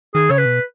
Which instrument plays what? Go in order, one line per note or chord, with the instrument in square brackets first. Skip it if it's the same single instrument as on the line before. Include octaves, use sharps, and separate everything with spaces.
[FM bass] D#3 [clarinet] G#4
[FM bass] C#3 [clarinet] C#5
[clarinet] B4
[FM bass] B2